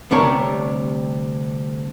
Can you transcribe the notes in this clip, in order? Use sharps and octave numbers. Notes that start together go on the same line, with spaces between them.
D2 C3 G3 D4 A#4 C#5